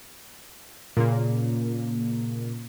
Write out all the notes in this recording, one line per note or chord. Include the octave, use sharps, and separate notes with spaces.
A#2 C#3 A#3